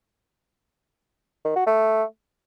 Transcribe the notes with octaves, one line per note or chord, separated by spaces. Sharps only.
D#3
F#4
A3